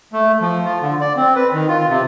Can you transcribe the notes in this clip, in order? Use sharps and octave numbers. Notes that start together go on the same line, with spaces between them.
A3
F3
F4
D3
D5
C4
B4
D#3
F4
C3